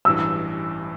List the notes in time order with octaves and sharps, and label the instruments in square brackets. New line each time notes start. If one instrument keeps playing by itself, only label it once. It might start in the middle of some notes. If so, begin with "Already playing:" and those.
[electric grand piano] A1 G2 E3 [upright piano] E6